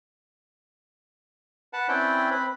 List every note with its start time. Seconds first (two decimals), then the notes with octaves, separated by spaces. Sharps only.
1.73 B4 F#5 A5
1.88 C4 C#4 E4 B4 D5 G5
2.31 C4 B4 B5